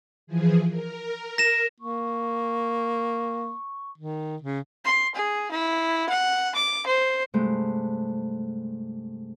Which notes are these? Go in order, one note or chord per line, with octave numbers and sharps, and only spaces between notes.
E3 F3 G#4
A#4
A#6 E7
A#3 C#6
D#3
C#3
C6
G#4
E4
F#5
D6
C5
G2 C3 G#3 A3 C5